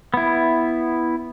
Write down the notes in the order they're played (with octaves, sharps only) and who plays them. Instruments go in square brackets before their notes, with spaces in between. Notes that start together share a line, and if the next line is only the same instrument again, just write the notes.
[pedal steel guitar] B3 E4